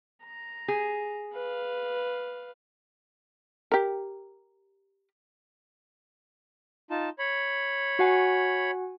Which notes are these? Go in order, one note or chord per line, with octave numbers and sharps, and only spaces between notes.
A#5
G#4
B4 F5
G4 A#4
D#4 F4 A5
C#5 B5
F#4 F#5 G#5